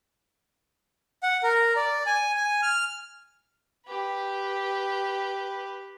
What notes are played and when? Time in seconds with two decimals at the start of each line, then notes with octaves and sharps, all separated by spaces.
1.23 F#5
1.43 A#4
1.76 D5
2.06 G#5
2.36 G#5
2.63 F6
3.87 G4 B4